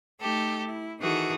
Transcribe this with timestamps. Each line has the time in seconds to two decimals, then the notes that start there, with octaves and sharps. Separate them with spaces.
0.21 A3 D#4 G4 A4
0.67 E4
1.00 D#3 E3 D#4 F#4 G#4 A4